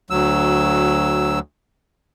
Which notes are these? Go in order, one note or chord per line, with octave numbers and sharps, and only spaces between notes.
D2 F#3 E6